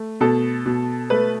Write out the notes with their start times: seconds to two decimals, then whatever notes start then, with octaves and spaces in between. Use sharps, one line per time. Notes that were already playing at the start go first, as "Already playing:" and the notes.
Already playing: A3
0.21 B2 A4
0.66 B2
1.10 A3 B4